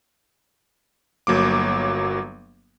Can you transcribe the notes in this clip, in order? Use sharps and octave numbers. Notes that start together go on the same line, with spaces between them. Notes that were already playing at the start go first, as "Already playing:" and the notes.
G1 F#3 A#3 D6